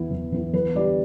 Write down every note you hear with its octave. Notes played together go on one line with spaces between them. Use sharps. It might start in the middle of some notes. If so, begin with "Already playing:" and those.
Already playing: E2 E3 B3 E4
E2
E3 B3 E4
E2 B4
D3 G3 E4 D5